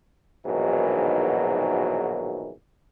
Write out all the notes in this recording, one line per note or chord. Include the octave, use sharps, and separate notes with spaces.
A#1 G#2 B2 D#3 E3 F#3